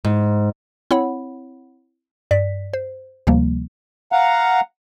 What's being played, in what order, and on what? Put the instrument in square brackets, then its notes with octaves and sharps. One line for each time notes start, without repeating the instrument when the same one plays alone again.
[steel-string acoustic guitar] G#2
[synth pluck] C4 E4 C#5 F#5 B5
G2 D5 B6
C5
D2 C3 F3 G3 A#3
[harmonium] F5 F#5 A#5